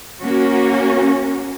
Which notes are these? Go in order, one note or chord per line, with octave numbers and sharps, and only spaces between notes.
A#3 C#4 F#4